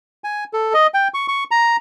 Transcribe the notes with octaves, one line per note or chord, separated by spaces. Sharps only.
G#5
A4
D#5
G5
C#6
C#6
A#5